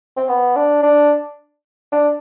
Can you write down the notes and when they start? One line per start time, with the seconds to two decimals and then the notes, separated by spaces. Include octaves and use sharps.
0.17 C4
0.29 B3
0.56 D4
0.83 D4
1.92 D4